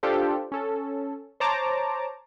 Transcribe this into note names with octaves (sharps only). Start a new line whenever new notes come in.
D4 F4 G4 A4 C5
C#4 A4
C5 C#5 A5 A#5 D6